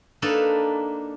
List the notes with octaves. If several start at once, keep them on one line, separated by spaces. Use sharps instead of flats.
A#3 D4 D#4 A4 B4